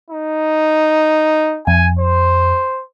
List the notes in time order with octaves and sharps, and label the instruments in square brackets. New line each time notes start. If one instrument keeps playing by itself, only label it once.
[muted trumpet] D#4
[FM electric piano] F2 [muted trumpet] G#5
[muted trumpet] C5